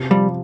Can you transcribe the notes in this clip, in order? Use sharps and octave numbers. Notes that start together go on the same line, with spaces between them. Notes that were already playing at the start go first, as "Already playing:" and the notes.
Already playing: C3
F3 G3